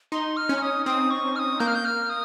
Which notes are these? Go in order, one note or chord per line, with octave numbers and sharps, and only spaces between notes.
D#4 C6
F6
C#4
D#6
C4 D#6
C#6
F6
D#6
A#3 G6
F6
G6
F6
D#6